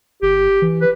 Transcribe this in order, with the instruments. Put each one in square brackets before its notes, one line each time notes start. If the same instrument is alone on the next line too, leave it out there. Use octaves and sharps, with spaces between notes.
[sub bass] G1 [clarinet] G4
[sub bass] E3
[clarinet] B4